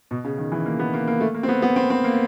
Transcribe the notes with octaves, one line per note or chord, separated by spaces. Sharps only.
B2
C#3
D#3
E3
A#3
B3
A#3
A#3
A3
A#3
C4
B3
B3
C4
C4
A#3